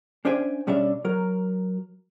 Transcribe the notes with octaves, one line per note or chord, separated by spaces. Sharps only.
C#4 D4 C5 E5 G5 G#5
B2 G3 C#4 D4 D5 E5
F#3 A#4